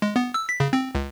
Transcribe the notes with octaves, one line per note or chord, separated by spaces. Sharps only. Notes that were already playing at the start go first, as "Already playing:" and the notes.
G#3
B3
E6
B6
C#3
C4
C#2